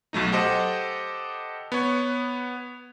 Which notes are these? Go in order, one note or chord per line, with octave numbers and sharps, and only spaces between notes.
B1 F#3 A3 D#4
G4 A4 C5 D#5 F#5
B3 C#5